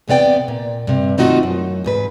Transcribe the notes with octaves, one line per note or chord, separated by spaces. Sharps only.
E2 C3 B3 D5 G5
A#2
G2 C3
D#3 A3 C4 D#4 F4 F#4
F#2
E2 G#2 B4